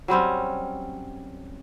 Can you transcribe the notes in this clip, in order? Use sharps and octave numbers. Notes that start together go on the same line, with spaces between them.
F#3 G3 C4 C#4